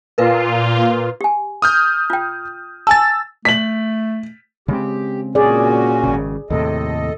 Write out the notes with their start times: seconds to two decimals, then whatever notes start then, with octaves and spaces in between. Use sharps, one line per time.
0.18 A#2 F4 A#4 B4 F5
1.21 G4 G#5
1.62 D#6 F6 G6
2.10 F4 G5
2.87 G#5 A5 E6 A6
3.45 A3 B6 F#7
4.68 C#3 G#3 C4 G4
5.35 A#2 C#4 F#4 G#4 D5
6.04 G#1 C#3
6.50 D#2 A2 C3 A4 D#5